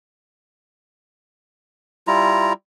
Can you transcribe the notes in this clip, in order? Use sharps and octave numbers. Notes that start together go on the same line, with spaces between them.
G3 E4 F4 A#5